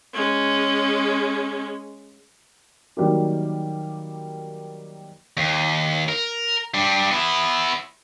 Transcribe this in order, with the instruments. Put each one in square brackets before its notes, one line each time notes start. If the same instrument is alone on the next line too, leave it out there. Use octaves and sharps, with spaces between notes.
[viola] G#3 C#4
[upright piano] D#3 F#3 G3 A#3 G4
[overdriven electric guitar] D#2
A#4
G3 D4
B3 E4